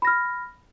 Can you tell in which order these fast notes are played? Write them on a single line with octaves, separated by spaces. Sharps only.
B5 A#6 F6